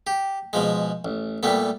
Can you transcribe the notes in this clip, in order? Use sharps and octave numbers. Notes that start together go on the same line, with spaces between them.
G4
B2 F3 G#3
A1
A#2 G3 A3 B3